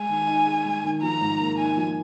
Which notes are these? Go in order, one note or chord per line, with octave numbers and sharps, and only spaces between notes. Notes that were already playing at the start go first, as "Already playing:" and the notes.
Already playing: G#3 G#5
D#3
D#4
G#4
G#3
D#3
F3 A#5
G#2
A#3
D#4 G#5
F3